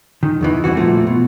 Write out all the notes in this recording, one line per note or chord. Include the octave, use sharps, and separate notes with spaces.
D#3
E2 D#3 E3
C2 C3 E3 F#4
A#2 F3 A3
B2